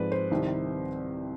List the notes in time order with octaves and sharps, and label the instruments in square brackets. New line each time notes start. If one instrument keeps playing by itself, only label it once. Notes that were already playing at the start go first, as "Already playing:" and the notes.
Already playing: [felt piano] G#2 F3 G#3 C4 B4 D5
C5
C2 C3 D#3 G3